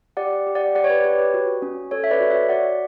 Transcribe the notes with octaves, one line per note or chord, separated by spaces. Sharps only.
G4 D5 F#5
G4
D5 F#5
G4 D5 F#5
C#5
B4 D5
G4 C#5
B4
F#4
C#4
A4 C#5
E5
B4 D5
F#4
C#5 E5
F#4 D5 F#5